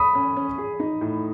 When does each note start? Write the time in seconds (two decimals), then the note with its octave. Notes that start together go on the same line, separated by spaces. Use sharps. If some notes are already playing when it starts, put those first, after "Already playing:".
Already playing: B5 D#6
0.15 C#4
0.37 C#4
0.58 G#4
0.80 D#4
1.01 A2